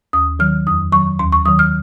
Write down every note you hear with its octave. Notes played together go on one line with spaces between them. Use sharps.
D#2 D#6
D#3 F#3 F6
F2 D#6
D#3 F#3 C#6
D#2 C6
C#6
D#3 F#3 D#6
F6